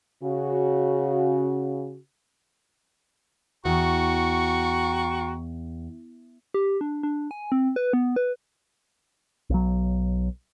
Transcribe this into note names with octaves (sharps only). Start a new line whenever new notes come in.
C#3 F#4
E2 F#4 G5 A#5 C#6
G4
D4
D4
G#5
C4
B4
B3
B4
B1 F#3